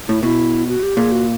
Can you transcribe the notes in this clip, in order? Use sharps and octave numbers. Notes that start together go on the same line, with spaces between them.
A2 E4
B2 E4
F#4
G4
A#2 G#4
F#4